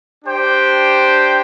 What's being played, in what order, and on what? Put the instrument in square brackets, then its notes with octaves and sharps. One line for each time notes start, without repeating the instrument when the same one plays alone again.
[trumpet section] D4 G4 C5 G5